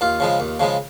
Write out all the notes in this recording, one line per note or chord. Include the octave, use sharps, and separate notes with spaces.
D#2 F4
C#3 F3 G#3
D#2
C#3 F3 G#3